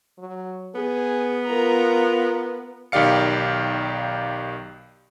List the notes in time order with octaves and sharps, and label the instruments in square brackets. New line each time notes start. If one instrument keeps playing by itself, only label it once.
[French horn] F#3
[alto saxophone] B3 [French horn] G#4
[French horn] F4 [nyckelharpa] A#4 A#5
[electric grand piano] B1 D#3 G4 D5 F5 C#7